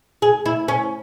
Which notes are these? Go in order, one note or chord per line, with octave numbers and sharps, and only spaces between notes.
G#4
E4
C#4